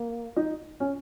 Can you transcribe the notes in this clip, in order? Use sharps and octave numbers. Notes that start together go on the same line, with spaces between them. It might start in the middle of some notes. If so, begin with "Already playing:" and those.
Already playing: A#3
D#4
C#4